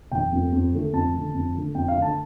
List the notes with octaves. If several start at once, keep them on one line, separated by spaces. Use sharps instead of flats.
F1 G5
F2 F3 A3
F2
D3 A3
F2 A5
D3 A3
F2
D3 A3
F2 G5
F5
D3 A3
A5